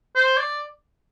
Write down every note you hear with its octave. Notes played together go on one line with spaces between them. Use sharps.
C5
D5